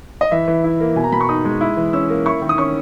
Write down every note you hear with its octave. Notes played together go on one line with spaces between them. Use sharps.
D#5
E3 E5
E3
E4
A#3
B2 G#5
A#5
B2 B5
C#6
D#4 D#6
G#3
E4
E3
C#4 E6
A#3
E4 C#6
D#3
D#6
C#4 C#6